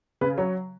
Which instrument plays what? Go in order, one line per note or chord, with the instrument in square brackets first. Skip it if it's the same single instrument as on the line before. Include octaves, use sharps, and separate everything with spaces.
[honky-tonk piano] C#3 [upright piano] B4
[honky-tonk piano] F#3 [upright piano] C#5